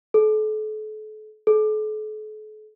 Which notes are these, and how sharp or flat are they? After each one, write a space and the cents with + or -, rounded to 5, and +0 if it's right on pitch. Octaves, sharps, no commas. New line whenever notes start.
A4 -40
A4 -45